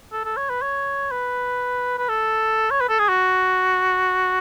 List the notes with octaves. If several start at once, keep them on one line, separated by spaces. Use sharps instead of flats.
A4
A4
C#5
B4
C#5
B4
B4
A4
C#5
B4
A4
G#4
F#4